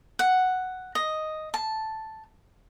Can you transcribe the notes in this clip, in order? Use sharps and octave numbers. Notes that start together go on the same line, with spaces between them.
F#5
D#5
A5